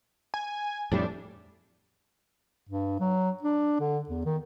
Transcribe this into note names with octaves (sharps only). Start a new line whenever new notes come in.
G#5
F2 A2 G3 D4
G2
F#3
D4
D3
E2
D#3